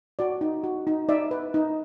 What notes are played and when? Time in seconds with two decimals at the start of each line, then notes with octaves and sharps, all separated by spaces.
0.19 F#4 D5
0.41 D#4
0.64 F#4
0.87 D#4
1.09 D#4 D5 E5
1.31 B4
1.54 D#4